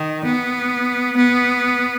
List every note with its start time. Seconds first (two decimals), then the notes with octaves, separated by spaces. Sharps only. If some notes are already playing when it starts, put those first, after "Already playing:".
Already playing: D#3
0.25 B3
1.17 B3